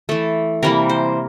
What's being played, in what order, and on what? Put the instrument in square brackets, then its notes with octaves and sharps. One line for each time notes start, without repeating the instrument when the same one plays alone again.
[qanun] E3 A3 A4
C3 E3 G3 A#3 A#4
C5